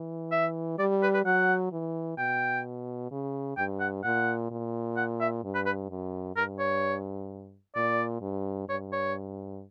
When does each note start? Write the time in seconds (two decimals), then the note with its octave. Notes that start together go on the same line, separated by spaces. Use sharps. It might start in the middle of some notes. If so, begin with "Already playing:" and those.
Already playing: E3
0.32 E5
0.78 G3 D5
1.03 B4
1.14 B4
1.25 F#3 F#5
1.72 E3
2.18 B2 G5
3.11 C#3
3.57 G2 G5
3.80 F#5
4.03 A#2 F#5
4.51 A#2
4.97 F#5
5.21 E5
5.44 G2
5.55 B4
5.66 B4
5.90 F#2
6.36 G2 A#4
6.59 C#5
7.75 A#2 D5
8.22 G2
8.69 G2 C#5
8.92 C#5